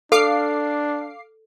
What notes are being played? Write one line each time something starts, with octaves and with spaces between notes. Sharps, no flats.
D4 A4 F5 D6 C7